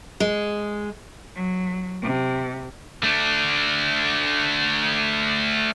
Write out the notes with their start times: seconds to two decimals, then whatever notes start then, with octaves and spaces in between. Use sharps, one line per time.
0.20 G#3
1.35 F#3
2.02 C3
3.03 A3 D4